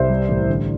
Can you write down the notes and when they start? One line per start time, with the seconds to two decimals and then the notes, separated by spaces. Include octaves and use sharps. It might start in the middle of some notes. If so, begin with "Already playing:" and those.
Already playing: C2 C5 E5
0.10 G3
0.29 A1
0.49 D3